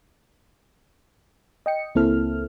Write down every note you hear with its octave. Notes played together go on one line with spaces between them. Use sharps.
D#5 G5 C#7
C#2 A#3 C4 E4 A4 F6